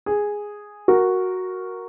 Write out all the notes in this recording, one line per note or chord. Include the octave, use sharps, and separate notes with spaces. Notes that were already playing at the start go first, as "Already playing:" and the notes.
G#4
F#4 A#4